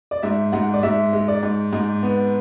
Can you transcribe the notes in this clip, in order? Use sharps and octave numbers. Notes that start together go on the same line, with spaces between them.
D5
G#2 E5
G#2 F#5
D5
G#2 E5
G#3
D5
G#2
G#2
B3